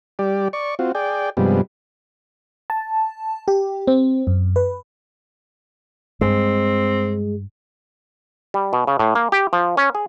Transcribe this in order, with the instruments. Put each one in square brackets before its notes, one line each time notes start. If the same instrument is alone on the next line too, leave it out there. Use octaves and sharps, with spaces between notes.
[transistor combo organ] G3 G4 D5
D5 C#6
C4 F4 F#4
G#4 D5 G5
G2 C3 F3 G3 G#3 B3
[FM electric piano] A5
G4
C4
F#2
B4
[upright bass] G2 [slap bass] G#3 [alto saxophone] C4
[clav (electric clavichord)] G3
B2
C#3
A2
A#3
G4
F3
C#4
G#4